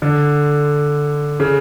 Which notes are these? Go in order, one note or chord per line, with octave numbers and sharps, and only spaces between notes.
D3
C#3